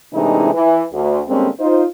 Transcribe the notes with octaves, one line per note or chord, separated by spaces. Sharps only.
A2 C3 E3 G#3 D4 D#4
E3
D2
D3 G3 G#3 A#3 C4 C#4
D#4 F4 C5